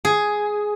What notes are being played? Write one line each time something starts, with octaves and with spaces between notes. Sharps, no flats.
G#4